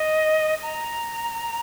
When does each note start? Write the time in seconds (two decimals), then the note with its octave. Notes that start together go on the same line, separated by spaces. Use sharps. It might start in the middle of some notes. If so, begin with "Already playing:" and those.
Already playing: D#5
0.63 A#5